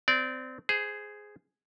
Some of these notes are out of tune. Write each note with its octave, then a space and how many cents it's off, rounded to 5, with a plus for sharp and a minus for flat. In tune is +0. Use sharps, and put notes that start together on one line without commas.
C4 -25 D5 -15
G#4 +0 C5 -25